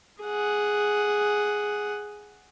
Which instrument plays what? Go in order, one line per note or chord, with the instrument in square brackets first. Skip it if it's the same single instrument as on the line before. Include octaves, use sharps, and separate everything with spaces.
[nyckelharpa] G#4 F#5